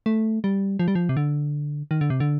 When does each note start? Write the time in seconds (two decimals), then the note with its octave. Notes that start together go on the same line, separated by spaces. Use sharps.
0.06 A3
0.44 G3
0.79 F3
0.88 G3
0.95 F3
1.09 C3
1.17 D3
1.91 D#3
2.01 D3
2.10 C3
2.20 D3